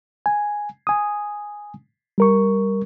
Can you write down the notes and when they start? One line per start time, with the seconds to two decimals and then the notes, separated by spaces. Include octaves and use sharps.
0.26 G#5
0.87 G#5 D#6
2.18 G3 A#4 C#6